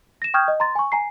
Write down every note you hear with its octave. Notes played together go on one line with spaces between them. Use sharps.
A#6 E7
G5 C#6 D#6 F6 G6 G#6
D#5
A#5 C6 A6
G#5 C#6
G#5 A#5 C7